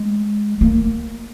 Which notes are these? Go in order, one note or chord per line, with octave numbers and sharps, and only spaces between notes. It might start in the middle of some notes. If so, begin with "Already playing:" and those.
Already playing: G#3
A#3